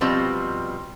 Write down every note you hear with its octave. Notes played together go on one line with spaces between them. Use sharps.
B2 F3 G3 C4